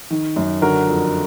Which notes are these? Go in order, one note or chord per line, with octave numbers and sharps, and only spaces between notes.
D#3
F#2
D3 F#4 A#4
F2